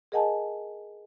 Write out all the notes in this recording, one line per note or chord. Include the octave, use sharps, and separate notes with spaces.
G#4 A#4 D#5 F#5 G#5 A5